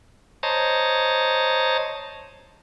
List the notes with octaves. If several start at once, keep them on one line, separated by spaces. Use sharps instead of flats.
C5 C#5 D#5 A5 A#5